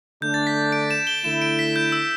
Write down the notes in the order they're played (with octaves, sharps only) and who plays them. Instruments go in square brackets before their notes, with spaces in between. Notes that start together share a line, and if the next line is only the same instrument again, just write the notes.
[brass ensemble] D3 A3 D4 [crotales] G6
[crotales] A6
B6
D7
E7
G7
[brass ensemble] D3 A3 E4 [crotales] E7
[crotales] D7
B6
G6
E6